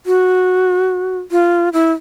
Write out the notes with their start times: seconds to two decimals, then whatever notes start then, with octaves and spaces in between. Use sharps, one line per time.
0.06 F#4
1.32 F4
1.73 E4